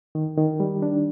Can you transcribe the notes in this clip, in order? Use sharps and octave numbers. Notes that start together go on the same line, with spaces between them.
D#3
D#3
G3
D4